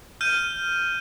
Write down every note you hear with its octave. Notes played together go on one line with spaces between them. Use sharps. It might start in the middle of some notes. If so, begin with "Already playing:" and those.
F6 G6 D#7